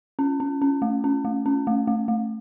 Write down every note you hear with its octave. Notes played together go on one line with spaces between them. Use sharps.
C#4
C#4
C#4
A3
C#4
A3
C#4
A3
A3
A3